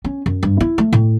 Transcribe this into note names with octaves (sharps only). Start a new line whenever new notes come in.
C#4
F#2
G2
E4
A3
A2